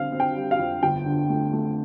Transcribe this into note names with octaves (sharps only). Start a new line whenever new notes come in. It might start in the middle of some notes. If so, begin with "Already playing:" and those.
Already playing: D3 C4 F5
C4
G5
G3
F5
F2
G1 G5
D3
A3
A3